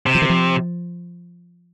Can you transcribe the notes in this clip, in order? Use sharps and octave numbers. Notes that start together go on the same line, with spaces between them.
C3
F3
D#3
F3